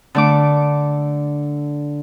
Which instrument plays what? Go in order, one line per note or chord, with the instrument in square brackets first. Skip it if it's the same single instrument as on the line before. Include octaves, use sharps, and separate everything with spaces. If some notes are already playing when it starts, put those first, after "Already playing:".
[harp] D3 A3 D6